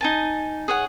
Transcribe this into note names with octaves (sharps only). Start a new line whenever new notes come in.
D#4 G#5 A5
G#4 C#5 F#5